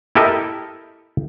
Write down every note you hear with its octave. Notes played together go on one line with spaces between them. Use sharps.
E4 G4 A4 A#4 D#5 E5